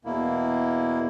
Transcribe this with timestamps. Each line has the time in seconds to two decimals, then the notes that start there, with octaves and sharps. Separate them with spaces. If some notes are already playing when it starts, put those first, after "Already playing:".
0.05 E2 B2 A#3 E4